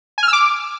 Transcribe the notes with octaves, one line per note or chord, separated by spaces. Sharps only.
G#5
F6
E6
D6